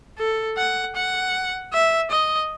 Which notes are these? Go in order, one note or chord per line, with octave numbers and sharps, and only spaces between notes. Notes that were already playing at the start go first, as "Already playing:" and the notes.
A4
F#5
F#5
E5
D#5